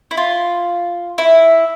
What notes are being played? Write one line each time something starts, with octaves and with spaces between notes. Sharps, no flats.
E4
F4
E4